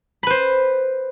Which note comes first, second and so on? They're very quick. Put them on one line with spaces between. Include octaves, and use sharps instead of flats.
B5 B4 C5